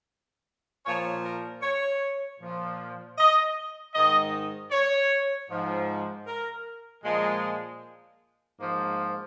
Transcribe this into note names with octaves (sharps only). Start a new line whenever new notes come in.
A#2 F3 C#5
A#4
C#5
A#2 F3
D#5
G#2 D#3 D#5
C#5
G#2 F3
A#4
A#2 F3 G#3
G#2 F3 A#3